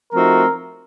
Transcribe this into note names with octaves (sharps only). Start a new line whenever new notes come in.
F3 A3 C4 D#4 F#4 A#4